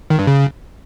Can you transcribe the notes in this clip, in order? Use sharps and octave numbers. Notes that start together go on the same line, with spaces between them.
D#3
G2
C#3